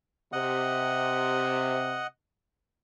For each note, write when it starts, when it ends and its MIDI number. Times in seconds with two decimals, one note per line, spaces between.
0.33 2.03 48
0.33 2.07 75
0.33 2.07 78